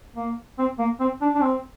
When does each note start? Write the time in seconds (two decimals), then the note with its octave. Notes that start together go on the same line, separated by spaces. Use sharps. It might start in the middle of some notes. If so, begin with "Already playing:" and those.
0.16 A#3
0.58 C4
0.79 A#3
1.00 C4
1.21 D4
1.35 D4
1.42 C4